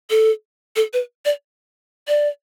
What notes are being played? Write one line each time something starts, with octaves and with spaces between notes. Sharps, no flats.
A4
A4
B4
D5
D5